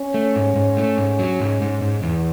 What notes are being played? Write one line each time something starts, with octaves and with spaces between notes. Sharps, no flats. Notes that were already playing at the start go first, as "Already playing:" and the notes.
Already playing: C#4
A3
G#2
G#2
A3
G#2
F#3
G#2
G#2
G#2
E2